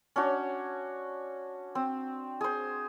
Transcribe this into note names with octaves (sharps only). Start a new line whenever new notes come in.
C#4 D4 F#4
C4
G#4 C5